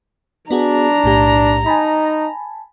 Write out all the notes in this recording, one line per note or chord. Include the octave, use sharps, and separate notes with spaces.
B3 D4 F#4 G#4 A#5
B1 A2 G4
D#4 G#5 A5 B5